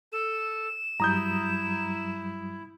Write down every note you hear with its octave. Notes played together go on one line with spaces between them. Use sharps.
A4 E7
G2 F#3 G3 E4 A#5 D#6 G6